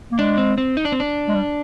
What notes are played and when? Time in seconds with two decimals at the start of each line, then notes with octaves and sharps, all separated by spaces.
0.12 A#3
0.19 G#3 D4
0.38 C4
0.58 C4
0.77 D#4
0.85 D4
0.92 C4
1.00 D4
1.28 G#3
1.35 G3